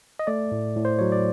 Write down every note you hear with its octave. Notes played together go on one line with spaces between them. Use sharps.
D#5
A3 D5
A2
A2
C5
F#3 C#5
D5